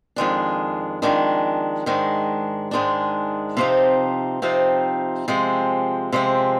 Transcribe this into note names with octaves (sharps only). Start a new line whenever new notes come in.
F2 D#3 G#3 D4
F2 D#3 G#3 D4
G#2 D#3 G#3 D4
G#2 D#3 G#3 D4
C3 F3 C4 D#4
C3 F3 C4 D#4
C3 F3 G#3 C4
C3 F3 G#3 C4